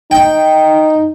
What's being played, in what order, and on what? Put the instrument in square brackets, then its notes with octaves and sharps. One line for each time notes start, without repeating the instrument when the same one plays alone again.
[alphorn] D#4 [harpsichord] G5